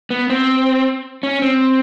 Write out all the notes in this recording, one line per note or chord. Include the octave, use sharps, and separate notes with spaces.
B3
C4
C#4
C4